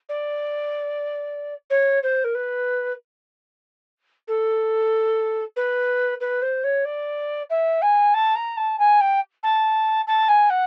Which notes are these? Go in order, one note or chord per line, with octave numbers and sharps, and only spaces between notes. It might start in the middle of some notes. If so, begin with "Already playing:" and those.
D5
C#5
C5
A#4
B4
A4
B4
B4
C5
C#5
D5
E5
G#5
A5
A#5
A5
G#5
G5
A5
A5
G#5
F#5